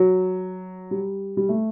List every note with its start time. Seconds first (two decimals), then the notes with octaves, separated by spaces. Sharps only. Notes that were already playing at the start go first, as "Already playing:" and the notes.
Already playing: F#3
0.91 G3
1.37 G3
1.49 A3